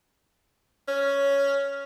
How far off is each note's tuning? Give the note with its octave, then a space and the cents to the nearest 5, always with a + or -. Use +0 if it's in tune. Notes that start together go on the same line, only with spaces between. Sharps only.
C#4 +5